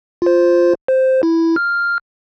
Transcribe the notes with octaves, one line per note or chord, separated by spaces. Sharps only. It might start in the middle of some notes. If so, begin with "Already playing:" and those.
F4 C5
C5
E4
F6